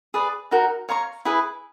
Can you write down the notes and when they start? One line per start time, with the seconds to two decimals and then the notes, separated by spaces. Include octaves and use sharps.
0.14 G#4 B4 D5
0.51 D#4 F#4 A#4
0.89 C#5 F5 A#5 C#6
1.25 E4 G#4 B4